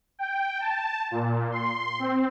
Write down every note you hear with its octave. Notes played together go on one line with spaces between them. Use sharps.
G5
A5
A#2
C6
C4